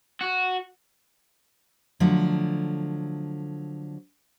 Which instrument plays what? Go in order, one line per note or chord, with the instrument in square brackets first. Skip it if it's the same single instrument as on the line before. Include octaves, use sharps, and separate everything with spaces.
[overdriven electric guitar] F#4
[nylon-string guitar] D3 F3 F#3 A3